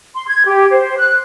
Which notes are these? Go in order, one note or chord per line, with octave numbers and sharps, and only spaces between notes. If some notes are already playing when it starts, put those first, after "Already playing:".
C6
G#6
G4
C5
F#6